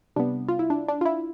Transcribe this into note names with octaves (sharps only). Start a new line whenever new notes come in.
C3 G3 B3 D4
F4
E4
D4
D4
F4
E4